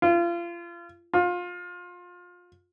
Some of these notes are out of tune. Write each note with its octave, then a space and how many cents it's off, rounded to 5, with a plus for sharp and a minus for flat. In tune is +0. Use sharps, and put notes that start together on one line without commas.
F4 -30
F4 +25